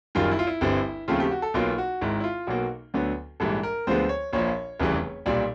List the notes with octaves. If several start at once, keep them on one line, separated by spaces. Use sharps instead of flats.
F#1 F#2 D#3 G3 F4
E4
F4
E4
G1 G2 D3 G3 C4
D#2 C#3 F3 A3 C4 F4
G4
F#4
A4
B1 B2 F#3 A#3 F4
F#4
G#1 G#2 D#3 E4
E4
F4
B1 B2 F#3 A#3 F#4
D2 D3 F#3 B3
A#1 G#2 E3 G3 A4
A#4
D2 D3 F3 G#3 B3 C5
C#5
A#1 A#2 F3 C#5
F1 E2 C#3 E3 G3
B1 A#2 G3 D5